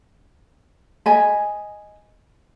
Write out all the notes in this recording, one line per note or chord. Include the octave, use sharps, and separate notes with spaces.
D#5 G#5 B5